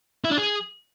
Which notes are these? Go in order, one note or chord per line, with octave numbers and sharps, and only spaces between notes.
E4
D4
G#4